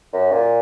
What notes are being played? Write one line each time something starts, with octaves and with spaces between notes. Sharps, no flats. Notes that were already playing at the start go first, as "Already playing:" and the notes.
F#2
A#2